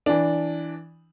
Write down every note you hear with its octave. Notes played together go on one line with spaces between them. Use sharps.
E3 D4